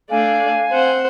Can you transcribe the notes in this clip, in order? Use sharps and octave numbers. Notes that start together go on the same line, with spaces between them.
A3 D4 D5 F5 G#5
C4 C5 F#5